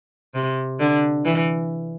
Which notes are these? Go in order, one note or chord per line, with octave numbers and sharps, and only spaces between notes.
C3
D3
E3